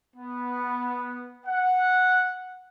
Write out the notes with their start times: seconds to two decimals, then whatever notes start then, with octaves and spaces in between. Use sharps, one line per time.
0.17 B3
1.47 F#5